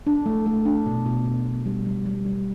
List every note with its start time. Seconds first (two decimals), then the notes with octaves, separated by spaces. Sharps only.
0.07 D4
0.26 A3
0.46 A3
0.65 D4
0.86 B2
1.06 B2
1.25 B2
1.46 B2
1.66 G3
1.86 G3
2.06 G3
2.26 G3